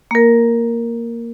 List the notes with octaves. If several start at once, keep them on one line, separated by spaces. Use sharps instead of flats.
A#3 A#4